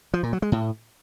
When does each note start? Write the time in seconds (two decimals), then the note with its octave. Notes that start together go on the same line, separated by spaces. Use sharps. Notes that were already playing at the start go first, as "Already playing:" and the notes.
0.14 F3
0.23 A#2
0.33 F#3
0.42 G#3
0.52 A2